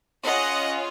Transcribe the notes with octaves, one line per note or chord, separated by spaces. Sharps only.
C#4 F4 G#4 D#5 F#5